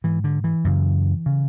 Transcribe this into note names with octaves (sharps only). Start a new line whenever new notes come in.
G#2 E3
D3
E3
F#2 C#3
C#3